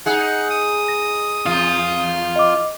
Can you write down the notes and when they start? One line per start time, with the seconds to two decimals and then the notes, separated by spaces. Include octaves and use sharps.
0.06 D#4 G#4 F#5
0.50 D#6
0.88 A#6
1.46 E2 F4
2.36 D#5 D6